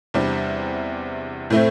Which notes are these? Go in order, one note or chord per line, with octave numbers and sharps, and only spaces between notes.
E2 C3 G3 D4 C5
A2 A3 C4